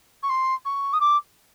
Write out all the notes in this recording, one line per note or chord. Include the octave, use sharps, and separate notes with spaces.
C#6
C6
C#6
D#6
D6